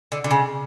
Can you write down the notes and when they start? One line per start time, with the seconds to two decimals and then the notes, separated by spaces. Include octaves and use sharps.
0.12 D3
0.24 D3
0.31 C#3